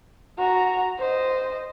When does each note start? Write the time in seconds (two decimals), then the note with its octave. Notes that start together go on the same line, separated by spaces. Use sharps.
0.39 F#4 A#5
0.99 C5 D#5